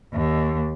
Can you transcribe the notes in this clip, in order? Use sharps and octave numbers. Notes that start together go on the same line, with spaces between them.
D#2